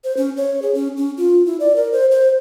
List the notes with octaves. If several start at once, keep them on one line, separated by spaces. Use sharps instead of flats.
C5
C#4
C#5
G#4
C#4
C#4
F4
E4
D5
A#4
C5
C5